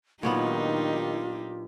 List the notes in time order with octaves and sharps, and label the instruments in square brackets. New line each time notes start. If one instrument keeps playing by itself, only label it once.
[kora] A#2 F#3 B3 [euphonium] D#3 [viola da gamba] D4 D#4 G4 [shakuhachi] F4